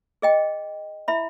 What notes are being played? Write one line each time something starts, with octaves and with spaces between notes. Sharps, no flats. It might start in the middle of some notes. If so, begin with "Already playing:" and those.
G#4 D#5 G5
E4 E5 B5